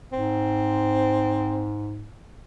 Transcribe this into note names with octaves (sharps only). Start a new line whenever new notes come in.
G#2 C4